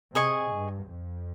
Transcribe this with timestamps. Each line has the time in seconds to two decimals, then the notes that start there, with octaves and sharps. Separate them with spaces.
0.15 C3 G#4 D#5 G#5 C#6
0.53 G2
0.89 F2